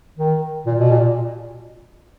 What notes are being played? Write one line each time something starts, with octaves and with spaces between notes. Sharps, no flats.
D#3
A#2
B2
A#2